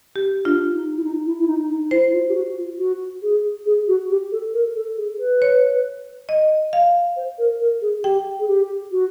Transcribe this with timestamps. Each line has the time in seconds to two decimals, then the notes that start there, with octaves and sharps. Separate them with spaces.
0.16 G4
0.45 D4 F4
0.74 D#4
0.97 E4
1.04 D#4
1.26 E4
1.39 E4
1.47 D#4
1.69 D#4
1.91 E4 C5
2.13 F4
2.29 G4
2.34 F#4
2.57 F4
2.78 F#4
3.22 G#4
3.66 G#4
3.88 F#4
4.10 G4
4.32 A4
4.54 A#4
4.76 A4
4.97 G#4
5.19 B4
5.42 C#5
6.29 D#5
6.73 F5
7.16 C5
7.38 A#4
7.60 A#4
7.82 G#4
8.04 G4 G5
8.39 G#4
8.48 G4
8.92 F#4